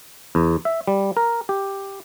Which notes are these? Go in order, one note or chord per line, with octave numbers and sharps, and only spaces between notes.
E2
E5
G3
A#4
G4